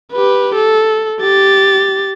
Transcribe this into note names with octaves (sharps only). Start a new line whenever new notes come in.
G4 B4
A4
G4 A6